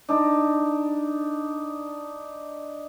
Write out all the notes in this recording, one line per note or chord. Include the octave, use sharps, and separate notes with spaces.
D4 D#4